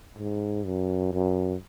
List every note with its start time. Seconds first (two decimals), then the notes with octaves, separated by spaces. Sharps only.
0.18 G#2
0.66 F#2
1.13 F#2